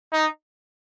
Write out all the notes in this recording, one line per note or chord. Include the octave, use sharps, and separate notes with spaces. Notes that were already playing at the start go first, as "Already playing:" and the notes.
D#4